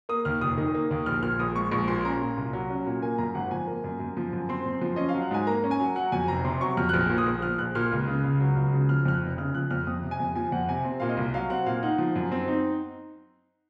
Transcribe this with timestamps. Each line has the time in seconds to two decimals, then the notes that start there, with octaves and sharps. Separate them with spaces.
0.09 A#3 D#6
0.25 D#2 F6
0.41 F1 D#6
0.57 D#3
0.74 A#3
0.91 D#2
1.06 A#1 F6
1.23 A#2 F6
1.39 A#1 D#6
1.56 G#3 C#6
1.72 A#1 C#6
1.88 A#2 C6
2.05 C#4 A#5
2.21 A#2
2.37 C2
2.53 F#3
2.70 C#4
2.86 A#2
3.02 A#3 G#5
3.18 F#2 A#5
3.35 G#1 F#5
3.51 F3 G#5
3.67 A#3
3.84 F#2
4.00 F#2
4.17 F3
4.33 F#2
4.49 C4 C6
4.66 F#2
4.81 F3
4.96 C#4 D#5
5.09 F5
5.14 F#3
5.22 F#5
5.31 G#2 G#5
5.47 A#3 A#5
5.64 C#4
5.71 G#5
5.80 F#3
5.96 F#3 F#5
6.12 F2 G#5
6.28 F1 A#5
6.45 C3 C6
6.61 F#3 C#6
6.77 F2 F6
6.89 F#6
6.94 A#1 F6
7.10 A#2
7.18 D#6
7.26 A#1
7.42 F3 F6
7.58 A#1 F#6
7.75 A#2 F6
7.92 C#2
8.08 C#3
8.24 C#2
8.40 F#3
8.56 C#2
8.73 C#3
8.89 F3 F6
9.05 F2 F6
9.14 F#6
9.22 F1
9.38 C#3 F6
9.55 F3 F#6
9.71 F2 F6
9.87 F2 D#6
10.03 C3
10.11 G#5
10.20 F2
10.36 F3 G#5
10.52 F2 F#5
10.69 C3 G#5
10.85 C4
11.00 A#2 F5
11.09 D#5
11.17 C2
11.34 F#3 F5
11.50 C4 F#5
11.66 A#2 F5
11.83 D#4 F#5
11.98 F3
12.16 F#2
12.32 C4
12.48 D#4